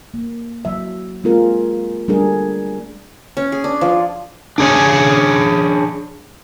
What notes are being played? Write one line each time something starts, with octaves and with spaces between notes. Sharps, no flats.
A#3
F#3 E5
G#3 A#3 C4 F4 G#4 A#4
G3 A3 D4 G#4 A#4
C#4
G#4
D4
F3
D4 G#4 C#5